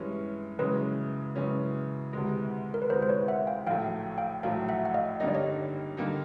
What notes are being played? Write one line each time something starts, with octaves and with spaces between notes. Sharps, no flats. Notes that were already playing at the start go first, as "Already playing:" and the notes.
Already playing: G2 E3 G#3 C#4
F#2 C#3 E3 G#3 C#4 B4
F#2 C#3 E3 G#3 C#4
D2 C3 E3 G#3
A#4
B4
D2 C3 E3 G#3 A#4 C5
C5
B4 C#5
E5 F#5
F5 G5
A#1 A2 F#3 A3 F5 G5
F5 G5
A#1 A2 F#3 A3 F5 G5
E5 F#5
F#5
D#5 F5
G2 D3 G3 A#3 D#4 D#5
D5
C#5 D#5
D3 G3 A#3 D#4